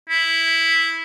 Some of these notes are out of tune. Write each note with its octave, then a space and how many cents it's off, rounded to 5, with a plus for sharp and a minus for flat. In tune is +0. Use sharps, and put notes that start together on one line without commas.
E4 -5